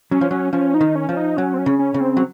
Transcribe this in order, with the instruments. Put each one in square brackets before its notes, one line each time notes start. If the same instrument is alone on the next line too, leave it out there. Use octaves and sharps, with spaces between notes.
[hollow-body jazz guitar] F#3 [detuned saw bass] C#4
[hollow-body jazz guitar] F3
[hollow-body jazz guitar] F#3 [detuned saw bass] C#4
[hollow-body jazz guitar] F3 [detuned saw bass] C#4
[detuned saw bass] D#4
[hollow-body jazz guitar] D#3
[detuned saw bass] C#4
[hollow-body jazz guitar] F3
[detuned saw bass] D#4
[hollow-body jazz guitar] F#3 [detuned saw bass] C#4
[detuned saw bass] C4
C#4
[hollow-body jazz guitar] C#3
[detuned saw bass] C#4
[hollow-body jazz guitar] C#3
[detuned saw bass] C4
[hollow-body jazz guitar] F#3